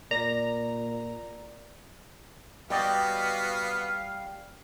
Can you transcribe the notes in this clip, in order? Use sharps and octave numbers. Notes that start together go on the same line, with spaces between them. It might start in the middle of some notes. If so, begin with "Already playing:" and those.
A#2 A#4 D5 A#5
G3 B3 F#4 D5 D#5 F5 G5